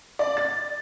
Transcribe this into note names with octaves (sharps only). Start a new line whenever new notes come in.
D5
A6